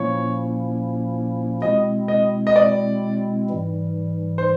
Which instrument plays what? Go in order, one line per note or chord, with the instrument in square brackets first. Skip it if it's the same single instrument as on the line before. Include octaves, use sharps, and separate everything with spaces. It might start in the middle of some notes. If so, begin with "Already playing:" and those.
Already playing: [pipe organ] A#2 F3 A#3 C#4 E4 [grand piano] C#5
[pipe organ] B2 G#3 C4 E4 [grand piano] D#5
[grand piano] D#5
D#5
D5
[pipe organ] G#2 E3 G3
[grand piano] C5